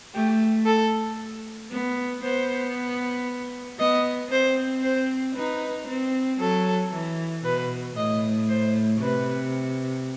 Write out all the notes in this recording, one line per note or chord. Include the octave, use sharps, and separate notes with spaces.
A3 G4
A4
B3
B3 C5
B3 D#5
C4 C5
C5
D#4 B4
C4
F#3 A4
E3
B2 B4
A2 D#5
C5
C3 B4